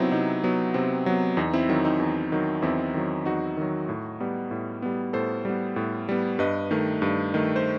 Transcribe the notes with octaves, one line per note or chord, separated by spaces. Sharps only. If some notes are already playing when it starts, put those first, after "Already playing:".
Already playing: C3 F#3 B3 C4 D#4 E4
C3 D#4
F#3 B3
C3 C4
F#3 B3
E2 D#4
C4 E4
D#3 F#3 C4
D#4
E2
D#3 F#3
E2 C4 E4
D#3 F#3
E2 D#4 F#4
D#3 F#3
A2
G3 B3
A2
G3 B3
A2 A4 C5
G3 B3
A2
G3 B3
G2 B4 D#5
D#3 A3
G2
D#3 A3
C5